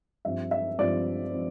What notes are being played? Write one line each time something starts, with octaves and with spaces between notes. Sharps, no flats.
G2 F3 C4 E5
E5
G2 F3 C4 D5
F3 C4